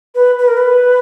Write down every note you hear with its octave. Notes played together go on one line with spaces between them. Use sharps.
B4
B4
A#4
B4